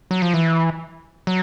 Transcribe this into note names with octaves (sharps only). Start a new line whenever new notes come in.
F#3
F3
E3
F#3